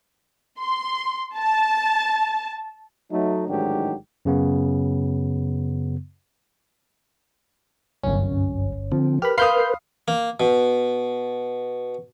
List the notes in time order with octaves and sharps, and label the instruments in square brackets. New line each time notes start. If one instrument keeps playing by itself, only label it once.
[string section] C6
A5
[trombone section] F#3 A3 D#4
A1 G#2 D#3 F#3 D4 G4
[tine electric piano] F#2 C#3 B3
[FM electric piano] G1 C#4 [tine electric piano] C2 F#2
[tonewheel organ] D3 C4 [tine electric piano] F3
[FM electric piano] G4 B5 [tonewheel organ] A#4 B4 [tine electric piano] F6
[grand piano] F5 D#6 [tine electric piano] B5 C6 [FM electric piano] F6 G6 C7
[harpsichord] A#3
B2